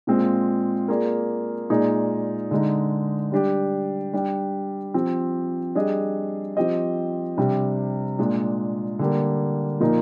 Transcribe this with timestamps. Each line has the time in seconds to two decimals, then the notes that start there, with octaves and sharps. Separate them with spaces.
0.07 A#2 G#3 C4 F4
0.88 A#3 F4 G#4 D5
1.70 A#2 G#3 D#4 G#4 D5
2.51 D3 G#3 D#4
3.32 G3 D4 G4
4.14 G3 D4 G4
4.94 F3 C4 G4
5.75 G3 D4 G#4 D#5
6.57 F3 C4 G4 C5 D#5
7.37 C3 G3 D4
8.19 A#2 G#3 D4
8.99 D3 G3 A#3
9.80 A#2 F3 A#3 D#4